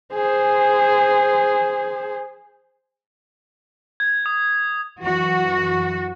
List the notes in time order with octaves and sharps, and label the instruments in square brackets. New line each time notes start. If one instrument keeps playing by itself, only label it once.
[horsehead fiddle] G#4 C5
[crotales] G#6
D#6
[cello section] F#2 E3 F#4